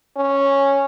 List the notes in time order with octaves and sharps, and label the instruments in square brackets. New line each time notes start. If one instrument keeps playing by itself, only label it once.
[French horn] C#4